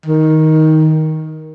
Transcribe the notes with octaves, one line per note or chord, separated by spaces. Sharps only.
D#3